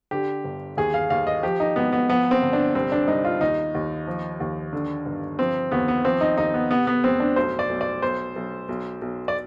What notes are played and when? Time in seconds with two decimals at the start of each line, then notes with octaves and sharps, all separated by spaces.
0.11 D3 G4
0.44 G1
0.77 D#2 G#4
0.94 F5
1.10 D#2 F5
1.27 D#5
1.43 F3 G4
1.60 D#4
1.76 G#1 B3
1.93 B3
2.09 F3 B3
2.31 C4
2.42 G1
2.53 D4
2.75 C2 C4
2.92 D4
3.08 C2 D#4
3.25 F4
3.41 D#2 D#4
3.75 D#2
4.07 F3
4.40 D#2
4.73 D3
5.06 G1
5.39 F3 C4
5.71 D#2 B3
5.88 B3
6.05 F3 C4
6.21 D#4
6.37 D#2 D#4
6.54 B3
6.71 C3 B3
6.87 B3
7.03 F1 C4
7.20 D4
7.36 B1 C5
7.59 D5
7.69 B1
7.81 D5
8.02 B1 C5
8.36 B1
8.69 B1
9.02 B1
9.28 D5